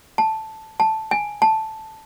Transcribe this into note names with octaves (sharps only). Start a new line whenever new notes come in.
A5
A5
G#5
A5